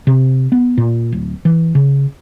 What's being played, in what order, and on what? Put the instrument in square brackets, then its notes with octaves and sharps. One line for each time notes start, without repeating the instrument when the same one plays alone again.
[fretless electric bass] C3
B3
A#2
D1
E3
C#3